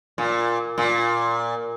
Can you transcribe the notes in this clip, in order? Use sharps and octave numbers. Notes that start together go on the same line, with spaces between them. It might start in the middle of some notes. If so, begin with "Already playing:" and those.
A#2
A#2